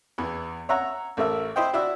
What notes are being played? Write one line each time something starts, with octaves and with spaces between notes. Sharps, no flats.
E2 E3
C#5 E5 F#5 A#5
A1 A3 A#4 E5
E4 C5 D#5 G5
D4 E4 F#4 D5 E5